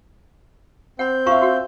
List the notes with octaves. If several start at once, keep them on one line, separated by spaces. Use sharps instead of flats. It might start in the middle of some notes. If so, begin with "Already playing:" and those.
C4 F#5 B5 G6
F4 E5 F5 A#5 C#6
F#4 F#5